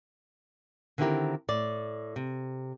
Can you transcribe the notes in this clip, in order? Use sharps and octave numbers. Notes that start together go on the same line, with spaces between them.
D3 D#3 C4 E4 G4 A#4
A2 D5
C3